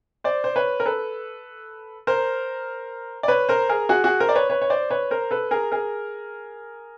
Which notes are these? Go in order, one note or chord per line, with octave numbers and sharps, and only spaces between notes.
C5 D5
C5
B4 C#5
A#4
A4 B4
A#4 C5
D5
B4 C#5
A#4 C5
G#4 A#4
F#4 G#4
F#4 G#4
A#4 C5
D5
B4 C#5
B4 C#5
C#5
C5 D5
B4 C#5
A#4 C5
A4 B4
G#4 A#4
G#4 A#4